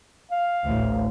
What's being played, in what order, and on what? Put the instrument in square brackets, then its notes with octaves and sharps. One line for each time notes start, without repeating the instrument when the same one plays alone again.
[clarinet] F5
[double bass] A1 D2